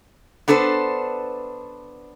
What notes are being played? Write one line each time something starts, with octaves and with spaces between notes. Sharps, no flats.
B3 D4 A4 B4 C5